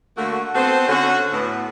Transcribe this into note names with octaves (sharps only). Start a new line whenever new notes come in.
D3 A3 A#3 F#4
B3 C4 F#4 A4 C5
D3 C#4 F#4
A2 B3